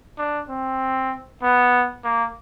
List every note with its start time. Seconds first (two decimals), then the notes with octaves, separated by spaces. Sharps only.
0.18 D4
0.49 C4
1.42 B3
2.04 A#3